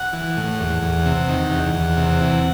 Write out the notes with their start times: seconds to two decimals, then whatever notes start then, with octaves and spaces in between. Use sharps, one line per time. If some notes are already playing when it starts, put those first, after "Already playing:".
Already playing: F#5
0.13 E3
0.37 A2
0.60 E2
0.82 E2
1.05 C3
1.29 D#3
1.51 E2
1.74 E2
1.97 C3
2.21 E3